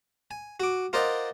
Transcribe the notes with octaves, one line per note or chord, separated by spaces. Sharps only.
G#5
F#4 D6
F4 A#4 C5 D5 D#5 F#5